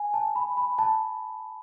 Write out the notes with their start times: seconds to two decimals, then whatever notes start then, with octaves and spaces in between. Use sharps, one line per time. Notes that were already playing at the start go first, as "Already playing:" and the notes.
Already playing: G#5
0.14 A5
0.36 B5
0.57 B5
0.78 A5